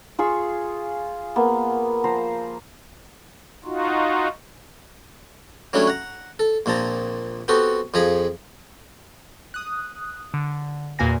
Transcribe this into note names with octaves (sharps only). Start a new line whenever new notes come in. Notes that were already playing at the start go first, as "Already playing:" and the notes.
F4 G#4 C#6 E6
A#3 B3
F3 C5 A#5
D#4 F4 F#4
F#3 G3 A3 C#4 D4 E4
F#5 A#5
A4
A#1 A#2 C4 A5 A#5
B3 C4 F#4 G4 A4
F2 F3 G#4 A#5 B5
D#6 F#6
D3
E2 A#2 A#3 F#4 G#5 A#6